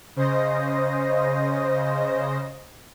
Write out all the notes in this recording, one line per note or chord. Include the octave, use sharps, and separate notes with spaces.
C#3 C5 D#5 A#6